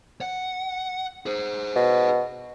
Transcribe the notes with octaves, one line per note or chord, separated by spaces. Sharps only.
F#5
G#4 C5
B2